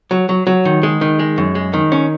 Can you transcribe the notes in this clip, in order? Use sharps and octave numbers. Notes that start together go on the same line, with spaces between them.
F#3
F#3
F#3
D#3
G#3
D#3
G#3
F#2
G#3
D#3
C#4